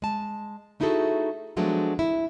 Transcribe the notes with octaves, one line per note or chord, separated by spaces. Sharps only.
G#3 A5
A3 D#4 E4 F#4 G#4 A4
F3 F#3 G#3 A3 B3 D4
E4